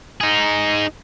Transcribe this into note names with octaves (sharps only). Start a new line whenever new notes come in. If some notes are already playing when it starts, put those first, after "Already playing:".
D#4 G#4